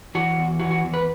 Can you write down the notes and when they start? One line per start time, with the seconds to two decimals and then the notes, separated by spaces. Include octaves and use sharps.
0.15 E3 F#4
0.38 E2
0.60 E3 F#4
0.71 F#4
0.83 E2
0.94 B4